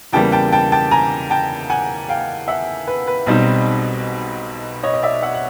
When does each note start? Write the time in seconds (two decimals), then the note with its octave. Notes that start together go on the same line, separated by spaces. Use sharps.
0.13 E2 C#3 E3 G3 A#3 G5 A5
0.32 G5 A5
0.53 G5 A5
0.72 G5 A5
0.91 G#5 A#5
1.30 G5 A5
1.70 F#5 G#5
2.09 F5 G5
2.48 E5 F#5
2.87 B4
3.08 B4
3.26 B1 B2 G3 C4 D#4
4.83 C#5 D#5
4.94 D#5
5.02 D5 E5
5.23 E5 F#5
5.34 F#5